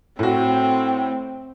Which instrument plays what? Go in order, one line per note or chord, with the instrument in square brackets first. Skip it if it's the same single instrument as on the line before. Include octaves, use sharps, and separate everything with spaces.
[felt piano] A2 F#4 [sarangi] C4